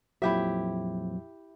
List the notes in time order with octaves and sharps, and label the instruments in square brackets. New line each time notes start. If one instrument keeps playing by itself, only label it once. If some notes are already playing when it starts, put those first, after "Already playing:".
[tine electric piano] F2 A#2 F3 [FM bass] F#3 [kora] E4 G4 E5